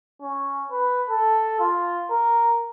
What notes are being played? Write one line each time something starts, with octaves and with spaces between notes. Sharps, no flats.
C#4
B4
A4
F4
A#4